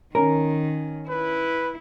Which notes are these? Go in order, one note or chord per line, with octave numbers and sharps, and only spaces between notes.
D#3 C#4 A#4
E4 B4